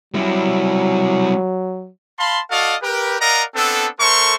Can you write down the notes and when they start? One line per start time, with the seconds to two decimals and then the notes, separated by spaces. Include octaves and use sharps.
0.14 F#3 G3 E4
2.19 F5 A5 B5 C6
2.51 F#4 A4 D5 D#5 F5
2.82 G4 A#4 B4
3.20 A#4 D5 D#5 F5 F#5 A#5
3.55 B3 C4 D4 A4
3.99 A3 A4 A#4 C5 C6 C#6